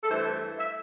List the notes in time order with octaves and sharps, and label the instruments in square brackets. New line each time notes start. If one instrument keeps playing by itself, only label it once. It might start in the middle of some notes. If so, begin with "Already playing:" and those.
[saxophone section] A4
G2 E3 A3 C5
E5